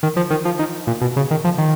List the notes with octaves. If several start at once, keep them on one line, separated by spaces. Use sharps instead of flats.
D#3
F3
D#3
F3
D#3
A#2
B2
C#3
D#3
F3
D#3